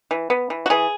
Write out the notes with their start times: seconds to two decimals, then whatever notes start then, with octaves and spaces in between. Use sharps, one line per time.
0.11 E3
0.30 B3
0.50 E3
0.66 F#4
0.70 E3 G#4